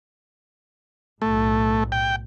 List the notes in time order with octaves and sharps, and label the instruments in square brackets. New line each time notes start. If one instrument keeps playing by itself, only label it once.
[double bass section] B1 A2 [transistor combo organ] A3
[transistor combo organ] G5